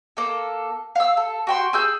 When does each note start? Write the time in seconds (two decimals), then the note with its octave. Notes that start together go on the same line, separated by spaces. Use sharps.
0.17 A#3 A4
0.95 F5 E6
1.17 A4
1.47 F#4 G5 C6
1.73 G#4 E6 G6